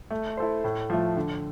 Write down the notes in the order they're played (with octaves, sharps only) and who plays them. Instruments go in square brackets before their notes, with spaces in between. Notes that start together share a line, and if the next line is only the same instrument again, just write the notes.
[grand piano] A3
E4 A4 C5
A2
F3 A3
D3